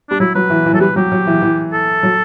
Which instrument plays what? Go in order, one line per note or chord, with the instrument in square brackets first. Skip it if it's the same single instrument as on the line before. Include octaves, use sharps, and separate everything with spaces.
[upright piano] G3 [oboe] D4
[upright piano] F#3 [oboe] E4
[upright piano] F#3 [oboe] B4
[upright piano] E3
E3
[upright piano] F#3 [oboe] A4
[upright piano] G3 [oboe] B4
[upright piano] F#3 [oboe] G4
[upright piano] F#3
E3
E3
[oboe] A4
[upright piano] F#3